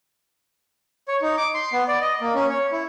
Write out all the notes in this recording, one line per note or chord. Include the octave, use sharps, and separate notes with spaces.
C#5
D#4
D6
C6
B3
D5
D#5
A#3
C#4
C#5
E4